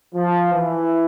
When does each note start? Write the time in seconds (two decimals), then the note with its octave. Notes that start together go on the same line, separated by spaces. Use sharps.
0.14 F3
0.52 E3